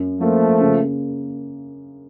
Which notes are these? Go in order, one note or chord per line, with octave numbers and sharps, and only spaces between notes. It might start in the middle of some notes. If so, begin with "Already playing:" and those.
Already playing: F#2
F3 A3 A#3
C#3